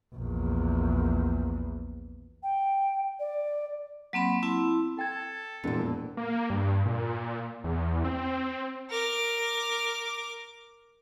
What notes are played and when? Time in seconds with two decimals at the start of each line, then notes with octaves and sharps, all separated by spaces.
0.15 A#1 E2
2.43 G5
3.19 D5
4.13 F#3 A#3 C4 B5
4.43 C4 E4 A5
4.99 A4 G5 G#6
5.64 E1 F2 A#2
6.17 A#3
6.50 G2
6.86 A#2
7.64 E2
8.04 C4
8.90 A#4 D6